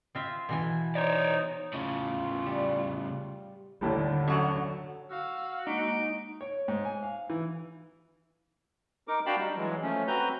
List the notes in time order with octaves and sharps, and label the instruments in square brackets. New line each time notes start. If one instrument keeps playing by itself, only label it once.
[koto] C4 F4 E5
B2 E3 G#5
[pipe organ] D#4 [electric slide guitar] C#5 D5
[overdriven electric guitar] A2 C#3 [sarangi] F4
[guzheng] G3
[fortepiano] D#2 A2 G3 [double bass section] D3
[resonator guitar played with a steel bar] F#2 F#3 F#5
[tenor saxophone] F#4 [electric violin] F5 E6
[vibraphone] G#3 A#3 D4 [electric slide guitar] D#4 [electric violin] D7
[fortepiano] C#5
G#2
G#5
F5
E3
[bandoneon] D#4 A#4 D6
D4 F#4 F5 G5 A5 B5
G3 D#4
E3 F#3 G#3
F3 A3 C#4
C4 F#4 B4 A#5 G6